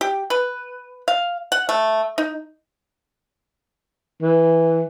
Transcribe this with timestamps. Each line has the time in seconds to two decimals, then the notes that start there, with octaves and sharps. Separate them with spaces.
0.01 G4
0.30 B4
1.08 F5
1.52 F#5
1.69 A3
2.18 D#4
4.22 E3